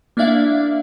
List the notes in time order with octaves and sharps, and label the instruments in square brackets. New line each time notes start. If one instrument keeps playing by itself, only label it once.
[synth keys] A#3 D4 E4 D5 E5 F5